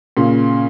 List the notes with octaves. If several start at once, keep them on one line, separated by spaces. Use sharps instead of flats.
A#2 C#3